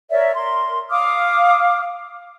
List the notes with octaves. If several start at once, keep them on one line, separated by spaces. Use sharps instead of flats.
A#4 C#5 D5 E5
A#4 C6
F5 D6 D#6 F6